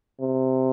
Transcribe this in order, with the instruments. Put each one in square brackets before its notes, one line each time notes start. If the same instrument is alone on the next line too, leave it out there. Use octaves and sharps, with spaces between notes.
[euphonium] C3